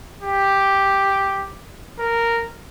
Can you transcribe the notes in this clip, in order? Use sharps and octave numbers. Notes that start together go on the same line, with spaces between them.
G4
A#4